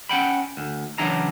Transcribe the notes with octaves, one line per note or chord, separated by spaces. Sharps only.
C#4 F#5 G5 B5
D2
C#3 E3 F#3 D4 E4 A#5